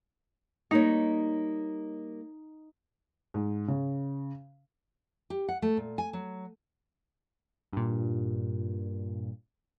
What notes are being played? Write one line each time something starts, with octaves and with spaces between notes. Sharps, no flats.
G3 A#3 D#4 C#5
G#2
C#3
G4
F#5
A3
A#2
G#5
F#3
G2 A#2